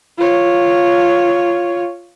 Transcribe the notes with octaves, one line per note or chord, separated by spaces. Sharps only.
F4 C#5